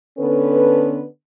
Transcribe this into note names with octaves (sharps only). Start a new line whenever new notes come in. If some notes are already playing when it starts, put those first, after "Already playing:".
D3 B3 C#4 A4 B4